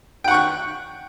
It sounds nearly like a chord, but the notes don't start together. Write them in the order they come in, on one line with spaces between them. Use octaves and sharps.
G5 F#5 C#6 F#6